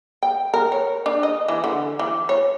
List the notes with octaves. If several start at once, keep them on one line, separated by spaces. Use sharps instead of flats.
G5
A#4
C#5
D4
D#5
E3
D3
E3
C#5